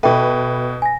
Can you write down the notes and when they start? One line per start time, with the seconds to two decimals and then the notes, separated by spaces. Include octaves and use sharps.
0.03 B2 A4 B4 E5 G5
0.82 G#5 A#6